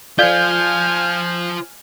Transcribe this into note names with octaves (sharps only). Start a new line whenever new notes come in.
F4 A4 C5 D5 F5 G#5 F6 G6